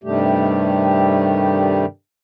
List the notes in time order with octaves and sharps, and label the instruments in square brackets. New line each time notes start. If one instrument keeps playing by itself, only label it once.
[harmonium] G2 C3 D#3 G3 A3 G4